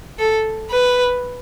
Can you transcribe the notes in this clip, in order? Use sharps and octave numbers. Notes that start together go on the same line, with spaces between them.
A4
B4